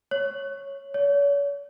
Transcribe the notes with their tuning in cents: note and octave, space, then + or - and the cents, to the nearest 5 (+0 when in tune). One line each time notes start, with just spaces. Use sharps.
C#5 +0
C#5 +40